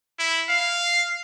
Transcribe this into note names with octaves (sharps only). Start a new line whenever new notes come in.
E4
F5